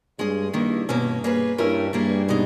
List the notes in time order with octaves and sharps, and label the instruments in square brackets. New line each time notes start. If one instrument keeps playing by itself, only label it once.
[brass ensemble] G2 [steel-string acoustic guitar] G#3 C#4 G#4
[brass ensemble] G2 [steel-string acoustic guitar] D#3 A#3 E4
[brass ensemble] G2 [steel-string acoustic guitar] B2 A#3 C#4
[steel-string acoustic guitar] A#3 C#4 G#4 B4
[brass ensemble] G2 [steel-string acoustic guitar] G3 C#4 E4 A#4
[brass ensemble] G2 [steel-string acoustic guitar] G3 A#3 E4 G#4
[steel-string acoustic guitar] B2 G#3 D#4